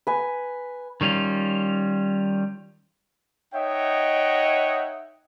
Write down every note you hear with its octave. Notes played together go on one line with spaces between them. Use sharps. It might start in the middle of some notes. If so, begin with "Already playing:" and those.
B4 G#5
D#3 G3 C#4 F4
D#4 C#5 D#5 E5 F#5 G5